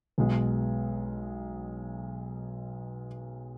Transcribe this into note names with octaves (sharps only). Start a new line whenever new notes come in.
B1 B2 G#3